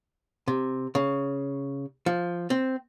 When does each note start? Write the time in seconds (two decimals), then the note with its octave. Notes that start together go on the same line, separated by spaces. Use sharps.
0.48 C3
0.95 C#3
2.06 F3
2.50 C4